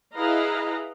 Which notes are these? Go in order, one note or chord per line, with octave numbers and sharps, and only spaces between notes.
E4 G#4 B4 D#5 F5 A#5